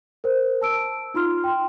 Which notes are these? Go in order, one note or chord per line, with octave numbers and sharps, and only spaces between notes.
A#4 C5
A5 E6 D7
D#4 F4 C6 F6
G5 C6